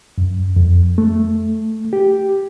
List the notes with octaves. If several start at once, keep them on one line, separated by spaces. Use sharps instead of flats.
F#2
F2
A3
G4